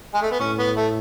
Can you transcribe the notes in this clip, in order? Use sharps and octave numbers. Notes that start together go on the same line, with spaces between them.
G#3
A3
B3
A2 C#4
B3
A3